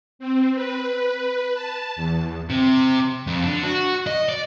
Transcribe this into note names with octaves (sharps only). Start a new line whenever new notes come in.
C4
B4
A5
E2
C3
F2
D3
F#4
D#5
D5